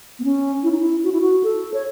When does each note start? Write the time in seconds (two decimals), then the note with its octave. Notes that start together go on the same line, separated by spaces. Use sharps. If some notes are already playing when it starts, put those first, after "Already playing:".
0.19 B3
0.24 C#4
0.63 E4
0.71 D#4
0.79 E4
1.04 F#4
1.12 E4
1.21 F#4
1.43 A4
1.74 C#5